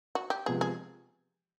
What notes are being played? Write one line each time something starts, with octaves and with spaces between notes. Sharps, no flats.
F#4
G4
C3 F3 G#3 B3 G#4
G#4